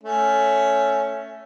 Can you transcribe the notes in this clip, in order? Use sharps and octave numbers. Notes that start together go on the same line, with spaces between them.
A3 C#4